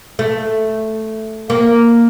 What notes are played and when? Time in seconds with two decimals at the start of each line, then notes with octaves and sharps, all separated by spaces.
0.19 A3
1.50 A#3